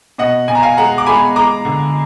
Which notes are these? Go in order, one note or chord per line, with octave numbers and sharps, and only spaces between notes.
B2 D#5 F#5
B2 G#5
A#5
F5 G#5
G#3 F#5 A#5
D6
G#3 G#5 B5
G#3 A#5 D6
D3